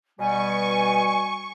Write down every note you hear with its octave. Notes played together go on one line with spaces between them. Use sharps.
B2 G3 G#5 C#6